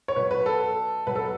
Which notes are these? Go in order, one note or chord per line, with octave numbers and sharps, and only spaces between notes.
C#5
B2 F#3 B4
B4
A4
B2 F#3 B4
A4